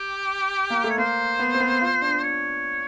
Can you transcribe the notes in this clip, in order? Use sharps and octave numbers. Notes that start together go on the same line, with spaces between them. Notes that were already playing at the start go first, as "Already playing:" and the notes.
Already playing: G4
A#3
A3
C#5
A#3 C5
B3
C4
B3
F4
D4
C#5